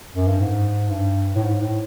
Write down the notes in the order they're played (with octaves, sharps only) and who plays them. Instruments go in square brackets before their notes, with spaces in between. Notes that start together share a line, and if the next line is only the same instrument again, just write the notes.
[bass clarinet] F#2
G2
G#2
G2
A2
G#2
A2